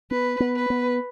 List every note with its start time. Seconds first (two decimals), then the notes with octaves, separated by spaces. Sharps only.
0.11 B3 B4
0.40 B3
0.55 B4
0.70 B3